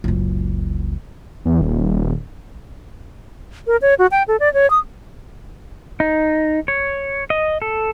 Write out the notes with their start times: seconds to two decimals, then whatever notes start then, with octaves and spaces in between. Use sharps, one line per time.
0.04 F#1 C#2
1.45 E2
1.61 D#1
3.67 A#4
3.82 C#5
3.99 F#4
4.11 G5
4.28 A4
4.40 D5
4.54 C#5
4.70 D#6
6.00 D#4
6.68 C#5
7.30 D#5
7.62 A4